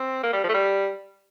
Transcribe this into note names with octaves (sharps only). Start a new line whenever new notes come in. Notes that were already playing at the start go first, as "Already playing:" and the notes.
Already playing: C4
A#3
G3
F3
A3
G3